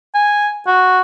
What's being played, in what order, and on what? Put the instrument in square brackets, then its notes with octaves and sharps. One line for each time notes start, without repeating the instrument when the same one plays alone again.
[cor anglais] G#5
F#4